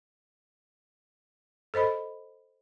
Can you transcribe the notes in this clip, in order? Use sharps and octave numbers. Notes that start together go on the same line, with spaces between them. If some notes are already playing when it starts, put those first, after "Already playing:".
A4 C5 D#5 B5